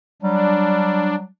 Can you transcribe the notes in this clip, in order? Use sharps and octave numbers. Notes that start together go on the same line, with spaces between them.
F#3 G3 D4